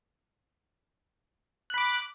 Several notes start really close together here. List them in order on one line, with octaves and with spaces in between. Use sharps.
F#6 B5 D6